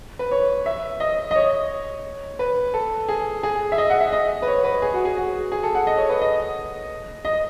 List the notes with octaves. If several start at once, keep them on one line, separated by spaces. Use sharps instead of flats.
B4
C#5
E5
D#5
D#5
C#5
B4
A4
G#4
G#4
E5
D#5
F#5
E5
D#5
B4
C#5
B4
G#4
F#4
G#4
F#4
G#4
A4
F#5
D#5
C#5
B4
D#5
D#5